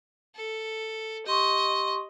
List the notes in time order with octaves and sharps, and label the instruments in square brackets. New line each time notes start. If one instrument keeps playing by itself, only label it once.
[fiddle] A4
[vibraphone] G4 C6 C#6 [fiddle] D#5